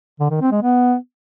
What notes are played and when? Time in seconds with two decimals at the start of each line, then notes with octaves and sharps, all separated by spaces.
0.20 D3
0.31 D#3
0.41 C4
0.52 G#3
0.62 B3